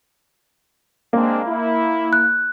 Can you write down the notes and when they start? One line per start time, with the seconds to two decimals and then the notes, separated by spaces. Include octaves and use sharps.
1.13 G#3 A#3 C4 D4
1.46 E4
2.13 F#6